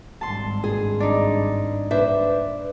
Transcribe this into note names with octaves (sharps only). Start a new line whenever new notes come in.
G#1 G2 A5 C6
G#4
D4 D#4
D4 B4 C5 E5